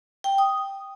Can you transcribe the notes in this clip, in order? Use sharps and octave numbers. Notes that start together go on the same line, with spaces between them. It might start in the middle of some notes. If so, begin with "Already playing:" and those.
G5
D#6